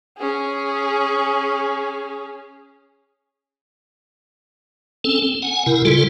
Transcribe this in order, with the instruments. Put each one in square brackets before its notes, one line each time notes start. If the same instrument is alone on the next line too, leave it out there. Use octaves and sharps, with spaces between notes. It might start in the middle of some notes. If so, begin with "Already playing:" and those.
[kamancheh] C#4 G#4
[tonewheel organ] C4 C#4 A4
C4
F#5 G#5
C3 E4 A#4
C#3 G3 F4 A4